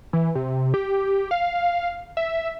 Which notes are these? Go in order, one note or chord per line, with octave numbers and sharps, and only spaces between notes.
E3
C3
G4
F5
E5